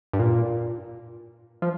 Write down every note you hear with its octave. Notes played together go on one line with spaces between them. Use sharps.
G2
A#2
F3